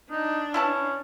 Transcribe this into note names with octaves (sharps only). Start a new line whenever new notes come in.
D4 D#4
C#4 E4 B4 A5